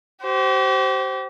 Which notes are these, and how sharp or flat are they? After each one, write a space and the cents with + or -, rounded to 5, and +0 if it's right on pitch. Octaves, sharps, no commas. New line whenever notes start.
G4 -40 C5 +0